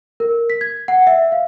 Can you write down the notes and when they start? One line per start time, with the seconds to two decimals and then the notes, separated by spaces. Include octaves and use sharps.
0.20 A#4
0.50 B6
0.61 G#6
0.88 F#5
1.07 E5
1.32 F5